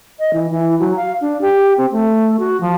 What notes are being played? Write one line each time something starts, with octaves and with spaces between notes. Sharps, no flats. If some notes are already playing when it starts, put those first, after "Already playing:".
D#5
E3
E3
F#3
F5
D4
G4
C4
A3
F#4
F3